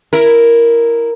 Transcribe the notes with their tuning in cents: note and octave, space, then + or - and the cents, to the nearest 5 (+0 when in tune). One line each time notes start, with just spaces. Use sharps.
E4 +0 A#4 +0